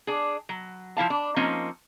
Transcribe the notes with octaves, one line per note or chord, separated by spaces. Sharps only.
D4 G#4
F#3
F3 E4 F5 A5
D4
F3 A#3 C4 C#4 D#4